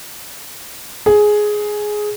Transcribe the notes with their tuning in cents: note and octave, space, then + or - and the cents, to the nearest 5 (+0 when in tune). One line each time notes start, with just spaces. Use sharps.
G#4 +10